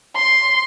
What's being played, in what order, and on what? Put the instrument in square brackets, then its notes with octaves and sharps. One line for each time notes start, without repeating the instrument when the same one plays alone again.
[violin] C6